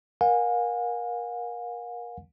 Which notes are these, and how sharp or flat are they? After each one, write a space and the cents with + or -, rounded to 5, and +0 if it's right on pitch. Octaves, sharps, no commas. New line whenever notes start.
A#4 +25 F5 +45 G#5 -25